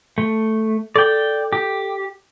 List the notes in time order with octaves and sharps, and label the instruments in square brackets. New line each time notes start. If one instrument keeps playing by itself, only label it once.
[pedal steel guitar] A3
[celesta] A4 [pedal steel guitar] D5 G5
[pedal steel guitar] G4